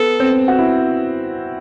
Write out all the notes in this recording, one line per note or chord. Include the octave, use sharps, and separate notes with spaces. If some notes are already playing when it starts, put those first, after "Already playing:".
Already playing: B3 A4
C4
F#4
E4